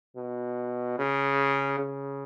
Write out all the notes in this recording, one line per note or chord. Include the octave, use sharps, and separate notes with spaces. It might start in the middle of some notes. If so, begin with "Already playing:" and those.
B2
C#3
C#3